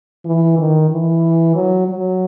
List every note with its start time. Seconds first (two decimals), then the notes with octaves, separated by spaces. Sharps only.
0.26 E3
0.58 D#3
0.90 E3
1.55 F#3
1.88 F#3